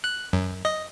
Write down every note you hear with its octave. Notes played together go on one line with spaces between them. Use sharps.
F#6
F#2
D#5